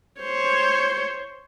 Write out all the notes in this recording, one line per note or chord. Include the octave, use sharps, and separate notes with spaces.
C5 C#5